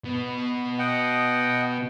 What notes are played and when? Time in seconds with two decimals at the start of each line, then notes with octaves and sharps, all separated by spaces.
0.04 B2
0.79 D#5 F#5 G5